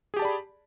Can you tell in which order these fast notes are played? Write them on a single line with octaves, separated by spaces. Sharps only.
G#4 G4 A5 D5 B5